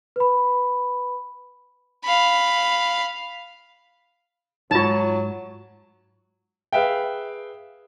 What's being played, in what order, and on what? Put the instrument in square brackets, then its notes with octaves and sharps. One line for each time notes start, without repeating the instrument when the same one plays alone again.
[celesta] B4 B5
[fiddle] F5 B5
[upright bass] G#2 [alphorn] F#3 [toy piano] D#4 F4 [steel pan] C#5 A5
[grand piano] G#4 B4 E5 F5 G5